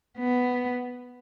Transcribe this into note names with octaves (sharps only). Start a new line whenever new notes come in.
B3